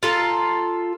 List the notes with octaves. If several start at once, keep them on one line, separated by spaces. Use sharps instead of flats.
F4 A4 A#5